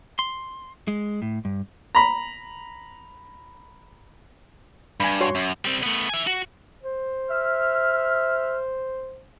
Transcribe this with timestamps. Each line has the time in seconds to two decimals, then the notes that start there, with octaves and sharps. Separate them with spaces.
0.19 C6
0.88 G#3
1.22 A2
1.45 G2
1.95 A#5 B5
5.00 G2 G#5 B5
5.21 F#4 C#5 C6
5.35 F#2
5.65 G3 C4
5.83 A3 B3
6.09 E5 G#5
6.27 F#4
6.83 C5
7.30 E5 F6